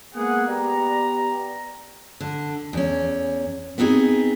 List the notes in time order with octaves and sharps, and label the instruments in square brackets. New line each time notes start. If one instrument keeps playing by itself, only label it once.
[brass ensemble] G#3 A#3 B3 G#4 F#5
B3 G4 D5 A#5
[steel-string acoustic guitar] D3
E2 C#4
B3 C4 D#4 F#4 G#4